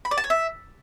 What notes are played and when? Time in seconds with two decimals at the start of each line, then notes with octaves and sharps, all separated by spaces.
0.05 B5
0.11 D5
0.18 A5
0.24 C#5
0.30 E5